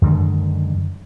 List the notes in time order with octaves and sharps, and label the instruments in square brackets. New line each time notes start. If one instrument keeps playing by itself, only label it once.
[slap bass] F#2 D3 D#3 G#3